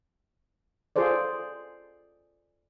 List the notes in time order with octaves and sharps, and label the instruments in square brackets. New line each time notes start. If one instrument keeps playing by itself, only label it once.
[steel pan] F4 G#4 A4 C5 D5